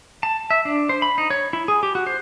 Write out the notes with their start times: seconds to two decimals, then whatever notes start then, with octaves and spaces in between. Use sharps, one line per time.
0.23 A5
0.51 E5
0.65 D4
0.89 C5
1.02 B5
1.18 D#4
1.31 C#5
1.53 E4
1.68 G#4
1.83 G4
1.95 F#4
2.07 C5